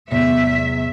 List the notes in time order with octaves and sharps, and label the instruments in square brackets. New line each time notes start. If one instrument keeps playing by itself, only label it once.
[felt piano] E2 [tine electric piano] A2 C3 F#3 [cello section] E5